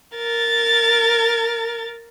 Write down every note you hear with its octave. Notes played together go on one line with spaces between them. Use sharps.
A#4 A6